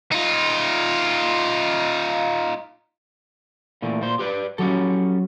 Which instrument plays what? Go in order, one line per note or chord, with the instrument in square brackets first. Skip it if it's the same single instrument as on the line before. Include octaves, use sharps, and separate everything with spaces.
[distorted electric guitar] D#4 F4
[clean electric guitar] A#2 E3 A3
A#2 C5 C6
G4 B4 D5
[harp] F#3 [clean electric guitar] C#4 G4 A4